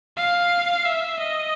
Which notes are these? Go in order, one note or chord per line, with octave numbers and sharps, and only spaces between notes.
F5
E5
D#5